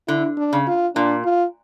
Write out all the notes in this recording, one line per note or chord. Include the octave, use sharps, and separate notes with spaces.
D3 E4
D4
C#3
F4
A#2 D4
F4